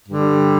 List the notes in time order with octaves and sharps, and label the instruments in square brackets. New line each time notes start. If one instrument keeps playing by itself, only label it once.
[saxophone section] G2 D3 G3